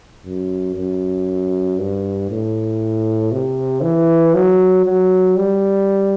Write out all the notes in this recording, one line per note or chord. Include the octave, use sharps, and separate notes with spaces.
F#2
F#2
G2
A2
C3
E3
F#3
F#3
G3